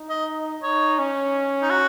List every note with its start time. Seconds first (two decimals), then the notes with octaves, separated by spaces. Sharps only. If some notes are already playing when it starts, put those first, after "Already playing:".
Already playing: D#4
0.10 D#5
0.63 D#4 C#5
0.99 C#4
1.62 D#4
1.70 F#4